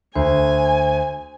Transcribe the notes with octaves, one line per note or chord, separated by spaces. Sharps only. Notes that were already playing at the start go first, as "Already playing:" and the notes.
D2 C5 G#5